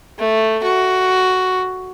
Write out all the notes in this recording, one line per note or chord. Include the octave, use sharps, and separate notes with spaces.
A3
F#4